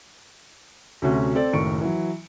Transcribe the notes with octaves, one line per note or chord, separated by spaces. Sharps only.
D2 C3 A3 C#4 F#4
C4 A4 D5
F#1 A2 D#3 C#6 C#7 D7
E3 F#3